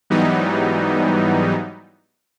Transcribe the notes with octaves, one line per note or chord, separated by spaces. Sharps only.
G#2 E3 F#3 G3 B3 D#4